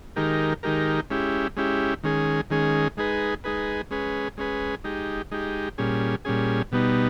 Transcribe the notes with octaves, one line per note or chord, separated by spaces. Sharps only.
D#3 G#3 D#4 G4 A#4
D#3 G#3 D#4 G4 A#4
G#3 C#4 E4 G4
G#3 C#4 E4 G4
D#3 G#3 C#4 G#4
D#3 G#3 C#4 G#4
G#3 D#4 G#4 B4
G#3 D#4 G#4 B4
G#3 C#4 G#4 B4
G#3 C#4 G#4 B4
G#3 D#4 G4
G#3 D#4 G4
A#2 G3 C#4 G#4
A#2 G3 C#4 G#4
B2 G3 B3 D#4